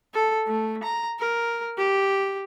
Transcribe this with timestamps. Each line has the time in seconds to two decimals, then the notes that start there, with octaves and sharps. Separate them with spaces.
0.14 A4
0.47 A3
0.83 A#5
1.19 A#4
1.78 G4